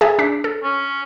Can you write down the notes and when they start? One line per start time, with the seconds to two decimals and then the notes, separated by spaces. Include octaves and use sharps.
0.01 G#4 E5 A5
0.19 D4 D6 B6
0.44 A4
0.64 C#4